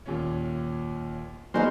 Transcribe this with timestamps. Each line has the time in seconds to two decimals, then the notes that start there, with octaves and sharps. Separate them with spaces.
0.06 D#2 A#2 C#4
1.54 F#3 A#3 B3 D#4 G#4 C5